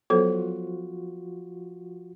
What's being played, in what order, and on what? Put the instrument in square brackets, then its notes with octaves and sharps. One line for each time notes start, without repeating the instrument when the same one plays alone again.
[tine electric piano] F3 F4 F#4 [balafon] F#3 B3 C5 [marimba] A4